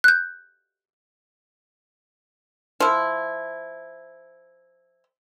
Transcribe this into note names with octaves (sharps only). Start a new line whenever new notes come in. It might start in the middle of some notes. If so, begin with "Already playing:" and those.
F#6 G6
F3 E4